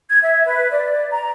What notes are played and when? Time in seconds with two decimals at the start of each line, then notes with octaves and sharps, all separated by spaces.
0.10 G#6
0.23 E5
0.46 B4
0.71 D5
1.11 A#5